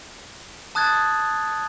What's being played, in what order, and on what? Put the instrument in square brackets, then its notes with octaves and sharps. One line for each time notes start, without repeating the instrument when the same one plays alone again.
[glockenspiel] A5 D#6 F#6 G#6 A6